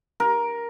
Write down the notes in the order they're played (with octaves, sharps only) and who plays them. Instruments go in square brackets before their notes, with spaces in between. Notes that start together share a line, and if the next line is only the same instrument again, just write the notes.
[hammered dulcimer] A#4